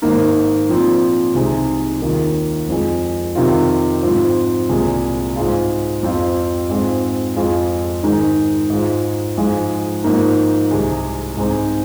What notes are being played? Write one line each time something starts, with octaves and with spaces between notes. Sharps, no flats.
G#2 D#3 A#3 D#4
A#2 F3 C4
C2 C3 G#3 D#4
D#2 D#3 A#3 F4
F2 F3 G#3
F2 C3 D#3 C4 F4
G#2 F3 C4 F4
C2 A#2 G#3
G#2 G#3 F4
F2 F3 C4 F4
G#2 G#3 C4 F4
F2 F3 G#3 F4
G#2 D#3 G#3 D#4
G#2 G#3 F4
G#2 F3 G#3 F4
G#2 F3 A#3 D#4
C2 C3 G#3
G#2 G#3 C4 D#4